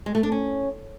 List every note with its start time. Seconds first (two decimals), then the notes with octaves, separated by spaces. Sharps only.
0.06 G#3
0.15 A3
0.23 D4
0.32 C#4